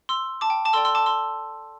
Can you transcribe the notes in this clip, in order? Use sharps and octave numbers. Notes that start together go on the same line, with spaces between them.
C6 E6
A5 D6
G5
A5 D6
A4 D5 G5 C6 E6
C6 E6
A5 D6
C6 E6